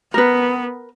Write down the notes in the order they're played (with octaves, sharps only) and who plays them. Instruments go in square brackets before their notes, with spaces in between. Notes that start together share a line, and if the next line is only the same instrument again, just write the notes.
[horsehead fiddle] B3 [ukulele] A#4 B4